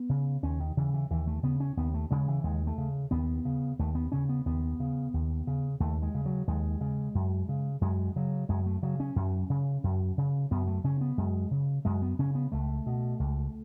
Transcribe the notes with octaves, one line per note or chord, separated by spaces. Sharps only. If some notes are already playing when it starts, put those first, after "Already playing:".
Already playing: B3
C#3
D#2 C#4
D#3
C#3 E3
E3
D#2 E3
A3
C#3 B3
C#4
D#2 B3
A3
C#3 G#3
E3
D#2 G#3
A3
C#3
D#2 B3
C#3
D#2 A3
B3
C#3 C#4
B3
D#2 B3
C#3
D#2
C#3
D#2 A3
G#3
C#3
F#3
D#2 G#3
C#3
F#2
C#3
F#2 G#3
C#3 F#3
F#2 G#3
A3
C#3 F#3
C#4
F#2
C#3
F#2
C#3
F#2 B3
A3
C#3 C#4
B3
F#2 G#3
C#3
F#2 G#3
B3
C#3 C#4
B3
C#2 A3
B2
C#2